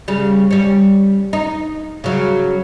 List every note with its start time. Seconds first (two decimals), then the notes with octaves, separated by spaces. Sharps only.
0.08 C#3 G3
0.51 G3 C#4
1.33 D#4
2.04 C#3 F#3